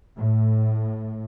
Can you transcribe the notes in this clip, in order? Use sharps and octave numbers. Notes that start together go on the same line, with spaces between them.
A2